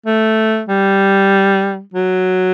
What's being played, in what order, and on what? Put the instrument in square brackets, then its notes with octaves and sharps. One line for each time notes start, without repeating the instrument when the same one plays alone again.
[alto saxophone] A3
G3
F#3